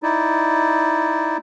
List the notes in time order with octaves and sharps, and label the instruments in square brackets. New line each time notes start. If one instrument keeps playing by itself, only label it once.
[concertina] D#4 E4 D5